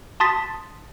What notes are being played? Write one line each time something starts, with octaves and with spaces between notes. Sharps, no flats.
A5 C6 D#6 A6 B6